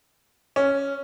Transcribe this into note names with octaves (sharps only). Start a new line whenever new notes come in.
C#4